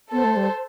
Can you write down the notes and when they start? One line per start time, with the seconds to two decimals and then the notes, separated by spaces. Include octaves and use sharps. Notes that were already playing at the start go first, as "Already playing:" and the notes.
0.12 B3 A4 C5
0.24 A3
0.37 G3